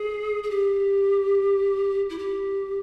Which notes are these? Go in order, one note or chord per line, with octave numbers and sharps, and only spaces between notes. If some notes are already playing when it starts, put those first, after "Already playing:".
Already playing: G#4
G#4
G4
E4
G4